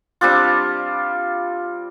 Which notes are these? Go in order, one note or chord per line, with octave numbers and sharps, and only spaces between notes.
G3 C4 D4 F4